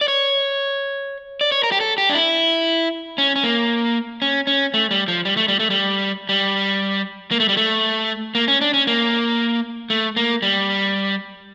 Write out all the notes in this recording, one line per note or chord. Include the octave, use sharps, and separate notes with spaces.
D5
C#5
D5
C#5
A#4
G4
A4
G4
D4
E4
C#4
C#4
A#3
C#4
C#4
A3
G3
F3
G3
A3
G3
A3
G3
G3
A#3
A3
G3
A3
A#3
C#4
D4
C#4
A#3
A3
A#3
G3